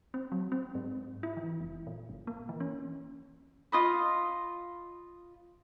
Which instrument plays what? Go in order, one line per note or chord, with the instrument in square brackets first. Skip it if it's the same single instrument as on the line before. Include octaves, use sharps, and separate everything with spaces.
[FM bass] C4
F#3
C4
G#2
E4
E3
F1
A#2
G1
A#3
E3
C#4
[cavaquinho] F4 D#5 B5